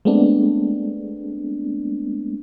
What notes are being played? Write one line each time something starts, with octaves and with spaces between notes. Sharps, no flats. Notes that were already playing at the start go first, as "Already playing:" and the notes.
G#3 A3 B3 C4 D4